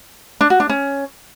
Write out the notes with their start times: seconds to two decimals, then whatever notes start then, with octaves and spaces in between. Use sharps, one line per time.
0.41 D4
0.50 F#4
0.60 D4
0.69 C#4